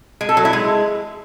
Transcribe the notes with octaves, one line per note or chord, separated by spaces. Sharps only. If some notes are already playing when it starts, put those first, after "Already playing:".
G#3
A4
F#3
E4
G#3